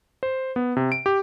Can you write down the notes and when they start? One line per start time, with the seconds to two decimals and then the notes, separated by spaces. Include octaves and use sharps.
0.23 C5
0.56 B3
0.77 C3
0.92 D7
1.06 G4